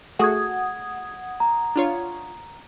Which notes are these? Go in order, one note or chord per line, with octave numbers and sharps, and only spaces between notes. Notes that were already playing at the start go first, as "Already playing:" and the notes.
A3 F#4 G#4 F#5 D#6 G#6
A#5
D4 F4 C#5